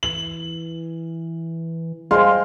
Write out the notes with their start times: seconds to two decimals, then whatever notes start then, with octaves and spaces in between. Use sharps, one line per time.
0.03 E3 F#7
2.11 G3 G#3 C5 F5 G5 C6 F6